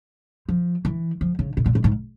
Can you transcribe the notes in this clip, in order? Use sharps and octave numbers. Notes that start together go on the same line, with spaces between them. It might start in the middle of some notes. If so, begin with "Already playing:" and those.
F3
E3
F3
C#3
B2
A#2
A2
G#2